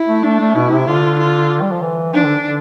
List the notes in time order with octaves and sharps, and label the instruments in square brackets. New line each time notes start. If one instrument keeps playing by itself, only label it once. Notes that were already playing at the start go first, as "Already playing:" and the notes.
Already playing: [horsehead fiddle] E4
[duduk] A3
[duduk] A3 [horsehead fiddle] D4
[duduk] A3
[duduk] B2 [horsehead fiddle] E4
[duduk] C3
[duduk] D3 [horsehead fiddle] F4
[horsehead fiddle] F4
[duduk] G3
F3
E3
[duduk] F3 [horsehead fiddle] D4
[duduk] D3
D3